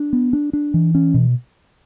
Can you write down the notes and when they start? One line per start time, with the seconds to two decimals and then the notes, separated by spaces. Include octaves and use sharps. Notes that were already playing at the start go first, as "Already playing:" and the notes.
Already playing: D4
0.13 B3
0.33 D4
0.53 D4
0.74 E3
0.95 C#4
1.14 B2